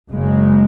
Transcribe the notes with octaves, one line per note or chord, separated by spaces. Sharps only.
F#1 F#2 C#3 G#3